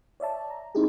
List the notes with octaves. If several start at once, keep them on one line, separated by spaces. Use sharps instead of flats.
C#5 D5 E5 A5
A#5
C4 D#4 E4 G4 G#4